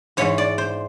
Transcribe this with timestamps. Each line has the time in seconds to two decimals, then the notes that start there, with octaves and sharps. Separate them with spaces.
0.17 G#2 E3 G#3 C#5
0.38 D5
0.58 C5